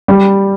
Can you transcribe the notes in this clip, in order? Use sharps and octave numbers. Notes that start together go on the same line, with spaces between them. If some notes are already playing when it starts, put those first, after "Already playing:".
G3